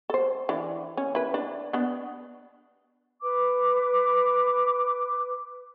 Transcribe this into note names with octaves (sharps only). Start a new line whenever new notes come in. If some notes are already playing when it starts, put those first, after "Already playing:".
A4 C5
E3 D4
C#4
E4 B4
D4
B3 D4
B4 D6